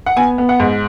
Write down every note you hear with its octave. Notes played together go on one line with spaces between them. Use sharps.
F#5
B3 G#5
B3
F#5
G#2